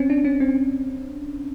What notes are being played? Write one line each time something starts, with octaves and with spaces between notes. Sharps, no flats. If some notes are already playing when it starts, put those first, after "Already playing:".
Already playing: C4 C#4
D4
C#4
C4